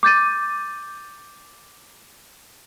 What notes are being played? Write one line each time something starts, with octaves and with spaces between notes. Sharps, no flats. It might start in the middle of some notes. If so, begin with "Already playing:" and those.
D6 G6 A6 D#7